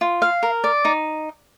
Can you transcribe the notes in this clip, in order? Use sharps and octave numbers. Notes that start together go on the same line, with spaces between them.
F4
F5
A#4
D5
D#4